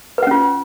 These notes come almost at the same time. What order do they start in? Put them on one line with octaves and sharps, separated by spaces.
B4 F#5 C#4 F4